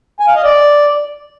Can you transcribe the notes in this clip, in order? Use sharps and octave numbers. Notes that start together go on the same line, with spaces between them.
G#5
F5
D#5
D5